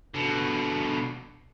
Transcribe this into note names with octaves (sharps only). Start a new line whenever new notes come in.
B2 D3